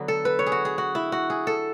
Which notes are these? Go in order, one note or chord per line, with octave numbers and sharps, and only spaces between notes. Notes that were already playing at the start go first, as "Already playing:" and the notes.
Already playing: D3 F#3 B3
A4
B4
C#5
G#4
F#4
G#4
F#4
E4
F#4
G#4
A4